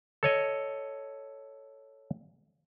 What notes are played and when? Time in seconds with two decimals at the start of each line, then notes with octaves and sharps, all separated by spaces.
0.23 A4 C#5 D#5